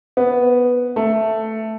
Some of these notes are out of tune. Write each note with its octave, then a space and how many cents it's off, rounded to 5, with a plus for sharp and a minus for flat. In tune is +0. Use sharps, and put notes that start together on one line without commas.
B3 -5
A3 +0